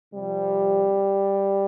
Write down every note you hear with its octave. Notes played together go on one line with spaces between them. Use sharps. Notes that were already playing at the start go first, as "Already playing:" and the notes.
C3 F3 G3